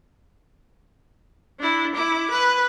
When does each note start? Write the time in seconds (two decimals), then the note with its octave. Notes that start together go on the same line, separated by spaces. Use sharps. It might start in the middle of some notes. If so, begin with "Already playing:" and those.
1.60 D4 E4
1.95 E4 D6
2.31 B4